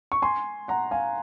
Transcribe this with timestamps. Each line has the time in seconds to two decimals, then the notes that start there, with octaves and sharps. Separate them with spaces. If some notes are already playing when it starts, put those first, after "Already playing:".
0.12 C#6
0.22 G#5 C6
0.68 F#5 A#5
0.91 F5 G#5